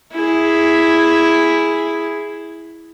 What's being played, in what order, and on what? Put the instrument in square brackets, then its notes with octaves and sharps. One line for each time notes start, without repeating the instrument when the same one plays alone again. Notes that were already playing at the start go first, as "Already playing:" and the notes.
[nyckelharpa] E4 G#4